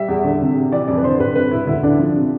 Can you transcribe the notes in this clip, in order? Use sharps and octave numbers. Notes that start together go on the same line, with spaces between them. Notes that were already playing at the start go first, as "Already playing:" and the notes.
Already playing: G3 E5
E2
D3
C3
C3
E3 D5
F2 D5
B4
D3 C5
G1 B4
C3 B4
E1 E4
D2 E4
D3 D4
F3
C3